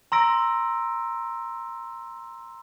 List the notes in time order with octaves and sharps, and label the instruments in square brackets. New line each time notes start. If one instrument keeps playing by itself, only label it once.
[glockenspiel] A#5 C6 E6 A#6 D7